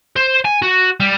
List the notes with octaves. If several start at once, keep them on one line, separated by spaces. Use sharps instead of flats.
C5
G#5
F#4
G3